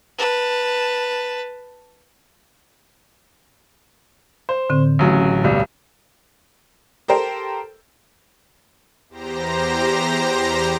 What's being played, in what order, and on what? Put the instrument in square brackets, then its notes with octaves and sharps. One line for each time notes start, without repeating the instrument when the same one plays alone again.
[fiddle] B4 A5
[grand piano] C5
[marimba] A2 D3 C4
[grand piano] A1 C#3 F#3
D1 B1 G3
[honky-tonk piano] G4 A4 A#4 C5
[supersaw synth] E2 G4 C5 A#5 A#6